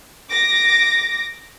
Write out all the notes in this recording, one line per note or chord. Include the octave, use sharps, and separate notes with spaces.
D6 A#6